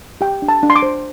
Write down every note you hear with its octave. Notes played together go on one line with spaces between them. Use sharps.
G4 G5
D4
A5
D4
C6
D6
C5